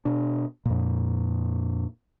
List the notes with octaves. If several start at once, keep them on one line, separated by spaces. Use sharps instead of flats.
B2 D4
F2 A#2